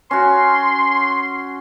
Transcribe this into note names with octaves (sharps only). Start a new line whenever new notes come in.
C#4 F#4 C6